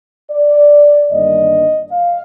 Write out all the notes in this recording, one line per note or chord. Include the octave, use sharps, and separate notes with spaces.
D5
G1 G2 D#3 A#3 D4 D#5
F5